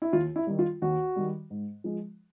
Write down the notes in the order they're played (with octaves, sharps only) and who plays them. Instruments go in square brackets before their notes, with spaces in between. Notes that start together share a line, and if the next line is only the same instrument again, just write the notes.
[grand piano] E4
D#2 F4
E4
D#3 G3
F4
D#2 F#4
D#3 G3
G#2
F3 G#3